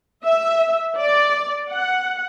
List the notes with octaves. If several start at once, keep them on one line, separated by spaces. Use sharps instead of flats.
E5
D5
F#5